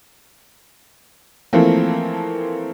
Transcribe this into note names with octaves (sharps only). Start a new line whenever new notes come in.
E3 F3 A3 A#3 C4